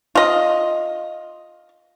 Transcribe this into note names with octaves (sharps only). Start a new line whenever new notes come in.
F4 D#5